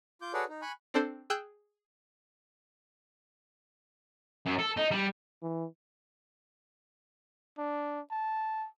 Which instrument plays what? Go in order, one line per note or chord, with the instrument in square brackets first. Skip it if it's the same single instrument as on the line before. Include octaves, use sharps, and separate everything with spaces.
[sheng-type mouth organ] F4 D6 G6
F#4 G#4 A4 B4 C#5 D5
D#4
G#5 B5 C#6 F#6
[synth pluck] C4 D4 A4 C5
G#4 G5 E6 F#6 G6
[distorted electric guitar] F#2
A4
D#4
G3
[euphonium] E3
[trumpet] D4
A5